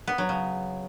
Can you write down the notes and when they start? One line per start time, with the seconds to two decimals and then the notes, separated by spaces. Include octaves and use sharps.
0.07 B3
0.18 F#3
0.29 C#3